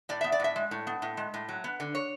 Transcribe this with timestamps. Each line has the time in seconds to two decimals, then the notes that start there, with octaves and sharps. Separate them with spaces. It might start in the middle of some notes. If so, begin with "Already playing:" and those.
0.09 A2 D5
0.21 B3 E5
0.32 D5
0.40 A2 E5
0.56 G#3
0.71 A2
0.87 B3
1.02 A2
1.17 G#3
1.34 A2
1.49 F#3
1.64 B3
1.80 D3
1.95 C#5